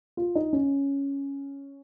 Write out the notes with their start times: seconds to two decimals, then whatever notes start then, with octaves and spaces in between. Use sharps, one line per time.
0.17 F4
0.35 D#4
0.53 C#4